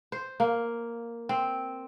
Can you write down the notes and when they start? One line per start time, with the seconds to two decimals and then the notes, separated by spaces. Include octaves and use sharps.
0.12 C5
0.40 A#3
1.29 C4